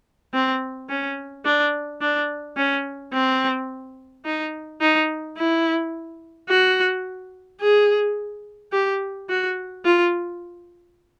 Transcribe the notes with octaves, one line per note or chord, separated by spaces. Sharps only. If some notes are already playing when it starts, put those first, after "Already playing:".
C4
C#4
D4
D4
C#4
C4
D#4
D#4
E4
F#4
G#4
G4
F#4
F4